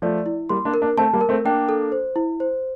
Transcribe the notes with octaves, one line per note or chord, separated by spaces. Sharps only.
F3 A3 D5
E4
G3 A#3 C6
A#3 D4
A#4
A#3 D4
A3 C4 A5
G3 A#3
A#4
A3 C4
A#3 D4 G5
A4
C5
E4
C5